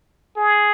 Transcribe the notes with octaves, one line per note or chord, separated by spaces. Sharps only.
G#4